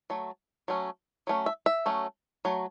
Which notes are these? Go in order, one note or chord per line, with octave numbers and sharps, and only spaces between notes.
F#3 A3
F#3 A3 C#4
F#3 A3 C#4
E5
E5
F#3 A3 C#4
F#3 A3